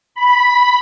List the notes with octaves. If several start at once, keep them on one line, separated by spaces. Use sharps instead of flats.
B5